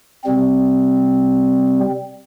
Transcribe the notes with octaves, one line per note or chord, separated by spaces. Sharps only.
C3 G3 C4